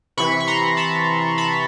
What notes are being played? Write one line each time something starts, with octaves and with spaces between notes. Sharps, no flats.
C3 E3 B5 C#6
C#6
A#5 C6
A5 B5
A5 B5